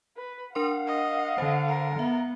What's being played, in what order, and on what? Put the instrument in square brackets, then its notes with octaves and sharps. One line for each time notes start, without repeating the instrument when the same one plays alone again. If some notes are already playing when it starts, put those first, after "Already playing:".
[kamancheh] B4
[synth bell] D4 A#4 C6 [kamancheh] F5 F#5
[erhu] D#5
[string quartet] D3 [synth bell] C5
[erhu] A#4
[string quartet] B3 [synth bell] E5